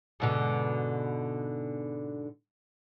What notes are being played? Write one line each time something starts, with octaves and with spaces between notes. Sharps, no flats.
G#2 B2 D3